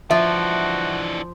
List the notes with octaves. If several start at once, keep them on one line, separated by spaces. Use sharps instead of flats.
E3 F3 D4 F#4 E5